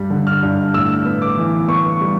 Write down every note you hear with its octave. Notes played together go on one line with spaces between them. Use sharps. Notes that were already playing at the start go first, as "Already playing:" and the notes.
Already playing: G2 G3
D3
F6
G2
A2 E6
B3
D6
E3
B3 C#6
G3